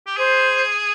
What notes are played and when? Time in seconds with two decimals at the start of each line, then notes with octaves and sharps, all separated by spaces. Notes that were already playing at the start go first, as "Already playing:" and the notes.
0.07 G4
0.17 G#4 C5